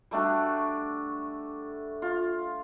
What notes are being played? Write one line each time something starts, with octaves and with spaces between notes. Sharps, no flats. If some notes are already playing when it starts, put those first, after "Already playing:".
G3 A3 D4 F#4
F4